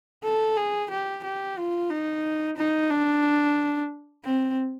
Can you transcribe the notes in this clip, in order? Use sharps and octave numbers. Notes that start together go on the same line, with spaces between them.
A4
G#4
G4
G4
F4
D#4
D#4
D4
C4